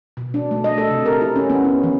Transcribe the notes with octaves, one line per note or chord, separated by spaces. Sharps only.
B2
D4
A3
D#5
A4
C3
A#4
E4
C#4
B3
E4
E3